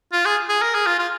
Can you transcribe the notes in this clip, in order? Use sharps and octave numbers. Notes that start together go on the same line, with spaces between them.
F4
G#4
G#4
A#4
G#4
F4
F4